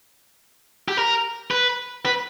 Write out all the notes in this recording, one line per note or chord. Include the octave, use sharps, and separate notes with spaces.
G4
A#4
B4
B4